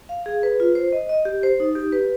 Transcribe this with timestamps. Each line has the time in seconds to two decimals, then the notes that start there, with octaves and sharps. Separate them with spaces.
0.09 F5
0.26 G#4
0.43 B4
0.60 F4
0.75 C5
0.93 D#5
1.09 D#5
1.25 G4
1.43 C5
1.60 D#4
1.75 G4
1.92 B4